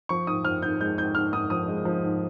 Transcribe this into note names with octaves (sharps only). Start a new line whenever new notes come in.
F3 C#6
G#2 D#6
F3 F6
G#2 G6
G#3 G6
G#2 G6
G#2 F6
G#2 D#6
F3 D#6
G#3
F3
G#2